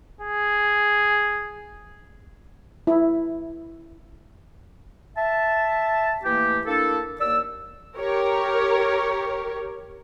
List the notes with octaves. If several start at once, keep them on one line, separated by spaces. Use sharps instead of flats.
G#4
E4
E5 A5
E3 A3 A#3 G4
A#3 D4 E4 A4
D#2 A#3 D5 E6
G4 A#4 C#5